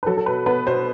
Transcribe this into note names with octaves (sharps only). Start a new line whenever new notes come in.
B4
F#3 A4
A4
B2 B4
B3 B4
B2 C5